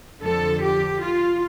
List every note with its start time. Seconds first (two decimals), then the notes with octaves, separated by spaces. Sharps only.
0.22 F2 D3 F3 A4
0.62 G4
1.02 F4